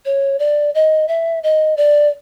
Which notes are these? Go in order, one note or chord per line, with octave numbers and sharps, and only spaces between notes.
C#5
D5
D#5
E5
D#5
D5